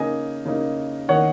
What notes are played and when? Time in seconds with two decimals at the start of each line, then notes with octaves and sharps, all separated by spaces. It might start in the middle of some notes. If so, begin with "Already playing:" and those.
Already playing: C#3 A#3 D#4 D#5 G#5
0.45 C#3 A#3 D#4
1.08 D#3 A#3 D#4 C#5 F#5